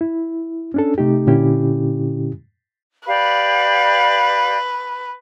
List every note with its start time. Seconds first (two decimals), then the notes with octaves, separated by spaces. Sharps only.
0.01 E4
0.74 C#4 D4 A4
0.98 C3 A3 D#4 G4
1.27 A#2 D3 C#4 E4 G4
3.07 G4 B4 D5 F5